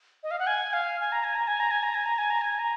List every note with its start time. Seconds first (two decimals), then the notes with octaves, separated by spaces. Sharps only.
0.23 D#5
0.31 F5
0.39 F#5
0.47 G#5
0.73 F5
1.01 G#5
1.12 A#5
1.24 G#5
1.35 A#5
1.48 G#5
1.60 A#5
1.71 G#5
1.83 A#5
1.95 G#5
2.06 A#5
2.18 G#5
2.30 A#5
2.41 G#5
2.59 A#5